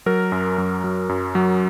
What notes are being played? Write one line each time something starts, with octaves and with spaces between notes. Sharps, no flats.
F#3 A#4
F#2
F#2
F#3
F#2
F#3